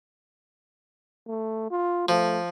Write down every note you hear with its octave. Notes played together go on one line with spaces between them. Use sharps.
A3
F4
F3 A3